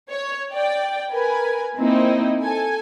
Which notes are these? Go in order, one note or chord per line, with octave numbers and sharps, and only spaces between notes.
C#5
D5 G5
A#4 B4 G#5
A#3 C4 D#4 E4
A4 G#5